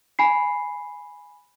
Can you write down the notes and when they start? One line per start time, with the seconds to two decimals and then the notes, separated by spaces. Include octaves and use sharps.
0.19 G#5 B5 C7